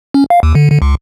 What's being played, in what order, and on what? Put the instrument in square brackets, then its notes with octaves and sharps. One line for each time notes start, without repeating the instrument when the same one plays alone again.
[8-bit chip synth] C#4
F5
D#2
D3
D3
C#2